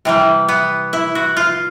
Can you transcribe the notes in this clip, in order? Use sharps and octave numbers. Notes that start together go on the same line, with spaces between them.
C3 E3 G3
B3
E4
F#4
F4